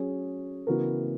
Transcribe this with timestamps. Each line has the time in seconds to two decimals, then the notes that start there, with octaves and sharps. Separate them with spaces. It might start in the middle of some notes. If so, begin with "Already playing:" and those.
Already playing: F#3 C#4 G#4
0.67 C#3 E3 B3 F#4 A#4